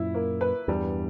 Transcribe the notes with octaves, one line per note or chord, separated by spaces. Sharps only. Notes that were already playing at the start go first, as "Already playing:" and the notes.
Already playing: F#2 A#2 E4
A#3
B4
E2 G2 G3